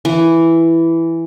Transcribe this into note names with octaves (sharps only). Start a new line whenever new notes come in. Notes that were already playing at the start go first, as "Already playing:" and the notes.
E3